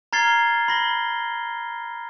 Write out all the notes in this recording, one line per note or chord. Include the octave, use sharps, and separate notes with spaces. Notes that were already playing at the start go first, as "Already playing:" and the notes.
A#5 F6 G#6 A6 C7 G7
B5 A#6 G7